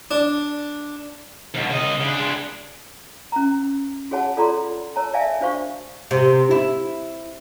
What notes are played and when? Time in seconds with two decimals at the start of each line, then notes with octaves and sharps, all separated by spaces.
0.11 D4
1.54 D#2 B2
1.70 C#3 D#5
2.01 C#3 D4
2.15 G#3 D4
3.32 C#4 A#5
4.11 F#4 G#4 C#5 F#5 A5
4.36 F4 A4 D5 A#5 C6
4.96 A#4 C#5 A5 A#5
5.14 D5 E5 F5 G#5 A5
5.40 D4 F#4 C5 F5 C#6
6.11 C3
6.51 E4